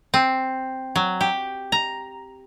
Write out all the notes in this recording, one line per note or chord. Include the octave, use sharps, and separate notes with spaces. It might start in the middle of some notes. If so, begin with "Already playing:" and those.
C4
F#3
G4
A#5